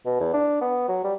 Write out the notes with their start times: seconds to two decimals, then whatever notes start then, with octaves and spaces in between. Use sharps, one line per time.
0.05 B2
0.20 E2
0.34 D4
0.61 B3
0.88 F#3
1.04 G3